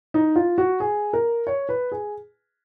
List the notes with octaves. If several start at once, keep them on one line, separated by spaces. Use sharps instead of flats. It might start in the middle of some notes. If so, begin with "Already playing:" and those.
D#4
F4
F#4
G#4
A#4
C#5
B4
G#4